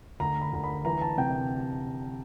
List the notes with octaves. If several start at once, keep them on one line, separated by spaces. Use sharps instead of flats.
D2 A#5
B5
D2 A#5
B5
E3 A#5
A5
C3 G5